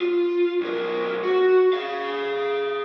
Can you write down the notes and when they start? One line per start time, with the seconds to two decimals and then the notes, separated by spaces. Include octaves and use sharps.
0.01 F4
0.61 B1 A#4
1.23 F#4
1.73 G#4 F5